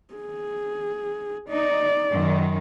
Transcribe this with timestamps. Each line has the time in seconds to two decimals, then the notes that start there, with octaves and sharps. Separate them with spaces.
0.14 G#4
1.50 D#4 D5
2.13 F#2 D#3